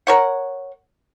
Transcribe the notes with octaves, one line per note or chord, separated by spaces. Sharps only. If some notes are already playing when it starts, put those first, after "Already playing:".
A#4 C#5 F#5